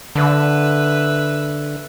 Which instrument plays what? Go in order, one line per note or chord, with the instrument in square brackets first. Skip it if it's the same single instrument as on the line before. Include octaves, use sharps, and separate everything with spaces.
[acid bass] D3 [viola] B4 E5